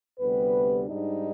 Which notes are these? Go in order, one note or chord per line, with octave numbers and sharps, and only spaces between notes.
D2 C3 G3 B3 B4
G#2 G3 D4 D#4